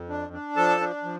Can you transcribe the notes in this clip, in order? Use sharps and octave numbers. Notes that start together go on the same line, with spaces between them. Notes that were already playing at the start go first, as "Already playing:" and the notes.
Already playing: F2
D4
D4
F3 A4 A5
D4
F3